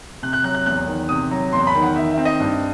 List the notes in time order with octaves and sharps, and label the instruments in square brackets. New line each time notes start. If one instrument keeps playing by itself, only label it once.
[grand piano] C3 F#6
F#6
F#3 F#6
F#6
E2 F#6
D#3
C3 D#6
F#3
E2 C6
B5
D#3
F#5
D#3 E5
E5
C4
D#5
G2